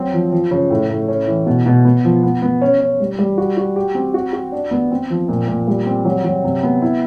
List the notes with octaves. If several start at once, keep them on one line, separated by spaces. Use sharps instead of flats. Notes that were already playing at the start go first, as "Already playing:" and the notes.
Already playing: F#3 C4
F3
F3
C#3
A2
A2
C#4
E3
B2
B2
B3
F3
B3
B3
C#4
C#4
G3
G3
F#4
F#4
G4
C4
F#4
F#4
D4
B3
C4
F3
A#2
A#2
G3
C4
F#3
F#3
C3
B3
E4